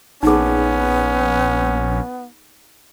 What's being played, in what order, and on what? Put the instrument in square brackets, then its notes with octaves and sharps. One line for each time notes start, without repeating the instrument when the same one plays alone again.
[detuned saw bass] A#1 [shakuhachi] B3 [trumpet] C#4 [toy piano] D#4 G#4